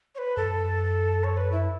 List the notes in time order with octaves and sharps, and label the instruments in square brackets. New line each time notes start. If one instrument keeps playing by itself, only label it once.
[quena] C#5
B4
[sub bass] F#2 [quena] A4
[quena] C#5
B4
E4